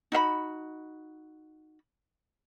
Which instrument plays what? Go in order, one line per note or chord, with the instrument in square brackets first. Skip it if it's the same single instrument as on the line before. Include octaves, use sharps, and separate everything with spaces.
[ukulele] D#4 F#4 E5 B5